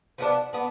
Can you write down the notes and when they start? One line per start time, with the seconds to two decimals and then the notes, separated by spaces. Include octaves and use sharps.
0.18 F3 B3 D4
0.53 B3 D4